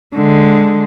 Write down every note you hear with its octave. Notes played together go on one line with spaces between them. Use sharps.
D3 G#3